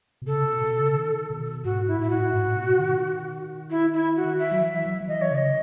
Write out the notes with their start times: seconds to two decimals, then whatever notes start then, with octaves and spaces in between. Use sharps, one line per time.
0.22 B2
0.26 C#3 A4
0.45 B2
0.61 B2
0.78 C#3
0.96 D#3
1.30 B2
1.64 G#2 F#4
1.88 E4
1.99 A2 E4
2.10 F#4
2.33 G#2
2.48 A2
2.56 B2
2.79 D#3
3.70 E4
3.94 E4
4.16 F#4
4.39 E5
4.51 F#3
4.62 E3
4.74 E5
4.86 F#3
5.01 F#3
5.08 E3 D#5
5.22 C#5
5.31 C#3 D#5